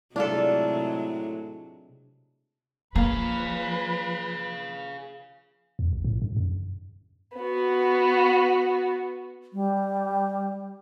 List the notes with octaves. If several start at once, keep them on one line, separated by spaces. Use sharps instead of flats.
A2 C3 F#3 G#3 D4 F4 A4
F3 A#3 G#4 B4 F5
E2
B1
A2
G2
F#2
B3 F#4
G3